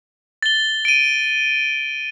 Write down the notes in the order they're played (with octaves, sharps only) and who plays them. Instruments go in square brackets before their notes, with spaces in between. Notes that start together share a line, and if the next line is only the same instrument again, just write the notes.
[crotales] A6 G7
D7 D#7